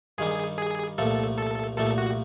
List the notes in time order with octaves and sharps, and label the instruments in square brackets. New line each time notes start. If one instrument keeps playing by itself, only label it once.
[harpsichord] G2 D#3 G3 [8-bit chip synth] G#4
[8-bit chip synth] G#4
[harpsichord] C2 A#2 F3 A3 [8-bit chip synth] A4
[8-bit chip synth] A4
[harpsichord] C2 A#2 F3 A3 [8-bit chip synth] A4
[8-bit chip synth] F#4